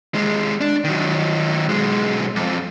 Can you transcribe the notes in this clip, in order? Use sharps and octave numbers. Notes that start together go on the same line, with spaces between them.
D#2 G#3
D4
D#3 F#3
B1 G#3
F2